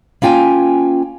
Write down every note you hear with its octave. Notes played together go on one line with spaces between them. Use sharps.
A#3 C#4 F4 G5 G#5